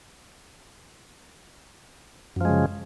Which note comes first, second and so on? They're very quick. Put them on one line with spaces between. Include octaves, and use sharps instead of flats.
F#2 F3 G#3 C#3